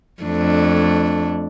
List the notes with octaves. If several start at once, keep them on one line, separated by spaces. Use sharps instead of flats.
F2 A3 D4